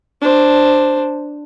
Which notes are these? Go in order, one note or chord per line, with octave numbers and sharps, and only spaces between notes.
D4 C5